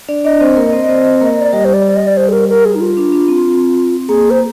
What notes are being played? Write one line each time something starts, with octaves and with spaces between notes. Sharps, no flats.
D4 D5
D4 D5 D#5
C4 C5
A#3 A#4
C4 C5
D5
C4 C5
A#3 A#4
D5
G3 G4 D#5
C5
D5
D#5
D5
C5
G#4
A#4
A#4
G#4
D#4
F4
D4
D4
C4
A#3 G#4
C5